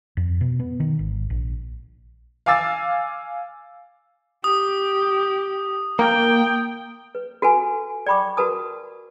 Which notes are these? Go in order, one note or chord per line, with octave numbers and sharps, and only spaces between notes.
F2
B2
B3
D#3
G#1
A#1
F5 G#5 D6 E6 A6
G4 D#6
A#3 G5
B4
F#4 A4 B4 G#5
D5 G5 B5 C#6 D6
F#4 A#4 B4 A5 D#6